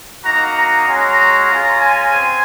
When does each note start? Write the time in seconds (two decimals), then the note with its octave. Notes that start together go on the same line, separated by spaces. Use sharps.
0.24 A#3 D#4 F#4 A#5
0.56 A#5
0.87 G#3 C#4 F#4 A#5
1.49 G#3 C#4 F4
1.81 G#5
2.11 C4